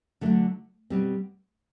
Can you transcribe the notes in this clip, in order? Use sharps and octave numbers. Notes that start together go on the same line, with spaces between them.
D3 F#3 A3 D4
B2 G3 C4